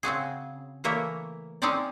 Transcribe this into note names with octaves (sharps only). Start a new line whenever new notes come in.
C#3 C4 F#4 G#4
E3 A3 A#3 A#4 C#5 E5
G#3 C4 C#4 D#4 C#5 D5